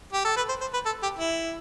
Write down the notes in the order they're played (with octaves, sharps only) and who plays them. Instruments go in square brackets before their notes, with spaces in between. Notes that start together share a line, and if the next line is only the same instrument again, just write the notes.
[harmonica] G4
A4
B4
C5
C5
B4
A4
G4
E4